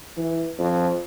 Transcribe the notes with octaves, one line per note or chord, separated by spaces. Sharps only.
E3
F2